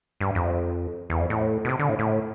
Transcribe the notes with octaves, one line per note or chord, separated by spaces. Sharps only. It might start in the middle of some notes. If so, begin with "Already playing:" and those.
G2
F2
E2
F2
A2
B2
C3
D3
A2
A2